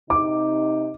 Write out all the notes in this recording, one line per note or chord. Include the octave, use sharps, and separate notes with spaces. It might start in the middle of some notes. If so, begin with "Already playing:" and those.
C3 D#4 D6